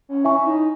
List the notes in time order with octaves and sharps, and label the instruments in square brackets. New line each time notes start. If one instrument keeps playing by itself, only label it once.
[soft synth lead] C#4
[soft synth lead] E4 [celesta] C#5 E5 G#5 C#6
[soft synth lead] D#4